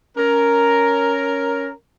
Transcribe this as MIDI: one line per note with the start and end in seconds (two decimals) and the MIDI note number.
0.18 1.71 61
0.18 1.71 70